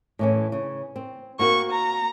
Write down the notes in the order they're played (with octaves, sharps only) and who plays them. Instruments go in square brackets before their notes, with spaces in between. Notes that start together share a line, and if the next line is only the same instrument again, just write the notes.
[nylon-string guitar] A2 E3 C#4
C#3
C4
[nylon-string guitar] A#3 C4 F#4 [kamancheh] C#6
[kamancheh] A#5